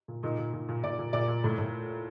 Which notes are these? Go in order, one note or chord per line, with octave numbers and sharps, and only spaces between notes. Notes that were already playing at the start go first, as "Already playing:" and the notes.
A#2
A#2 D#4
A#2
A#2
A#2
A#2 D5
A#2
A#2 D5
A#2
A2
A2